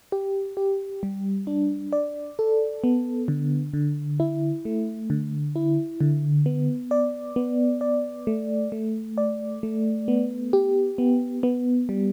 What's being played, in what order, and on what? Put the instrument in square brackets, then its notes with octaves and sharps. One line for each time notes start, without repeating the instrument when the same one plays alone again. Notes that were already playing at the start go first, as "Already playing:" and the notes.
[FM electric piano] G4
G4
G3
D4
D5
A4
B3
D3
D3
E4
A3
D3
E4
D3
B3
D5
B3
D5
A3
A3
D5
A3
B3
G4
B3
B3
G3